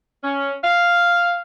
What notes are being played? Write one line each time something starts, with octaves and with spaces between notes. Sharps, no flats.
C#4
F5